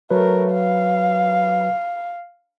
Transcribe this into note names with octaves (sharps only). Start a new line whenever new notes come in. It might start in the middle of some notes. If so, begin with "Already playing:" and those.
F#3 A3 A#4 B4
F5